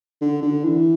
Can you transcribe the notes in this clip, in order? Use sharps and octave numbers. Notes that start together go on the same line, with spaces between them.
D3
D3
E3